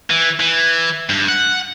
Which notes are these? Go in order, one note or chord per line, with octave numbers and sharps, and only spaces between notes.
E3
E3
G2
F#5